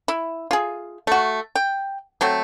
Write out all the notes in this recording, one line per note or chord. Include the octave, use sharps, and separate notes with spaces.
E4
F4 G#4
A3 F#4
G5
F#3 A3 C4